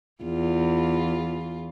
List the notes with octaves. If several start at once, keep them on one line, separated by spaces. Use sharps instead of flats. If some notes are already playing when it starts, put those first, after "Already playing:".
E2 F4